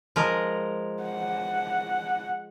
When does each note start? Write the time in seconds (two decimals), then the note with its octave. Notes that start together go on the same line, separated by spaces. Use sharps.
0.16 F3 G#3 A#4
1.03 F#5